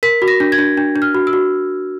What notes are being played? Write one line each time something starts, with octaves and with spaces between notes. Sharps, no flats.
A#4 B6
F#4
A#6
D4
G#6
D4
D4
D4
F6
F#4
E6
F#4